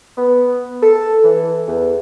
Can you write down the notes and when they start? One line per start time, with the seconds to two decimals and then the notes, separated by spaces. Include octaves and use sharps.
0.17 B3
0.82 A4
1.24 E3
1.68 E2